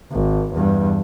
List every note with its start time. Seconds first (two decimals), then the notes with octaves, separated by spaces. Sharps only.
0.12 G#1
0.53 E2 G2